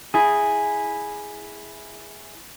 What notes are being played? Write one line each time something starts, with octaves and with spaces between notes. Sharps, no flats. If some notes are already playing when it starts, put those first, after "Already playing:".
E4 G#4